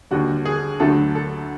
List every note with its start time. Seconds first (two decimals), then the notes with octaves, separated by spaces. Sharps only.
0.11 D#2 D3 G3 F#4
0.45 G#4
0.80 D2 D3 F#3 A3 A4
1.15 A4